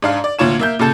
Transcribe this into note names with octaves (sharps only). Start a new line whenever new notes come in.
G#2 D4 F5
D5
D2 A#2 F4 C#5 E7
A#3 E5 G6
A#2 C#3 A4 E7